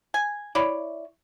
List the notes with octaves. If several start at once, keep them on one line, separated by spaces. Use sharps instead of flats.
G#5
E4 C#5 D5